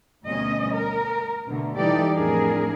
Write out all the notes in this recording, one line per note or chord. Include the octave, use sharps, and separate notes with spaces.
D2 B2 G3 C#4 D#5
A#4
B2 D3 A3
E3 G3 D#4 G4 A4 D5
F2 A2 D4 G#4 A#4